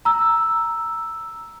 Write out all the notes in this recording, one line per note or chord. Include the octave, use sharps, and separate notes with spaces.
A#5 E6